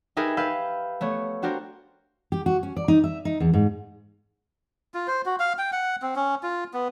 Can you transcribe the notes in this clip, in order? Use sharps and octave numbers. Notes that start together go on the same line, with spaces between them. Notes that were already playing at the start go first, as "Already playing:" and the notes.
D#4 G4 G#4 A#4 B4 E5
B4 F5 E6 G6
A3 B3 C#5
D4 F#4 G4 A#4 C5
G4
F#4
C#4
D5
D#4
E5
D#4
E2
G#2
F4
C5
F#4
F5
G5
F#5
C4
C#4
F4
B3